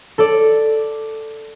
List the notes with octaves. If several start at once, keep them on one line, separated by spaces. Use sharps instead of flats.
A4 D5